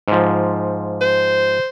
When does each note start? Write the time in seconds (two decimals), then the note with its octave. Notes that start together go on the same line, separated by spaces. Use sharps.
0.08 G#2 F3
1.01 C5